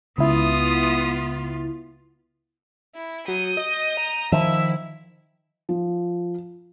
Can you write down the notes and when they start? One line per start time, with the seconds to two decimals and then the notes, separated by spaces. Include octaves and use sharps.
0.18 C#2 B3 E4 F4 D#6
2.95 E4
3.28 F#3 D#6 G6
3.57 D#5
3.97 A#5
4.32 D#3 F3 E4 E5
5.69 F3